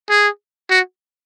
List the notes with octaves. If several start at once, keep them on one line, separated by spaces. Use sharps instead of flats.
G#4
F#4